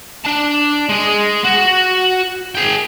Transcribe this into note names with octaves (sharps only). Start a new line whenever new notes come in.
D4 A5
G#3 G#4
F#4
G#4 G5